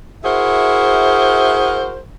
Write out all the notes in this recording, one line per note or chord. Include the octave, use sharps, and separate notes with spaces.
E4 F#4 G#4 A#4 C5 E5